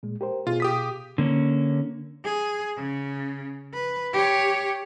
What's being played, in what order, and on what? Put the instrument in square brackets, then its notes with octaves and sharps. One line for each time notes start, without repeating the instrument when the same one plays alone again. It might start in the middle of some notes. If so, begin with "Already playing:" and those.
[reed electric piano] A#2 G#3
G4 A#4 C5
[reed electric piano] B2 G#4 F5 [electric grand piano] F4
[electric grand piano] G4 D#6 B6
[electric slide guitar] D3 A#3 C#4
[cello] G#4
C#3
B4
G4 C#5